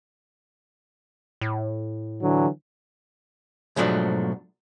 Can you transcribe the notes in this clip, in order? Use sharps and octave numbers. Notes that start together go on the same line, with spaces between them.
A2
D3 E3 F#3
G#2 B2 F3 F#3 A3 D4